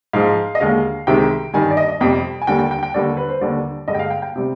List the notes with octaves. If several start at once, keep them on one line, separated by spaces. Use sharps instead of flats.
G#2 F3 G#3 F5
D#5
D#2 D3 G#3 F5
C2 C3 D#3 G#3 G5
G2 D#3 G3 G#5
D5
D#5
D#5
F2 C3 G3 G5
G#5
D#2 D3 G3 G5
G5
G5
G5
D#2 D3 G3 D5
B4
C5
D#2 D3 G3 D5
G2 D3 G#3 D#5
G5
F5
G5
G5
C3 G3